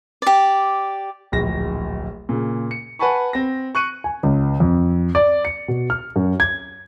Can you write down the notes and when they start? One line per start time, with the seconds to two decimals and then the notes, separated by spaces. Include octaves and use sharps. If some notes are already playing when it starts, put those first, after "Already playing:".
0.22 G4 D5
1.32 D1 A#1 A#6
2.29 A#2 C#3
2.71 C#7
2.99 B4 F#5 G#5 A5 B5 C#6
3.33 C4 A#6
3.75 C#6 F#6 C#7 D#7
4.04 G#5
4.23 C#2
4.60 F2
5.15 D5
5.45 C#7
5.68 B2
5.90 F6
6.16 F#2
6.40 G#6